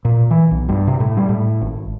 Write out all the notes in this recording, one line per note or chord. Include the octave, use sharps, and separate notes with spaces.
A#2
E3
B1
G2
C3
A2
G3
A2
G#1